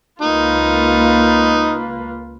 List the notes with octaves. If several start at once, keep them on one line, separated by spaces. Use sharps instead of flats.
C#2 A#3 D#4 F4 B4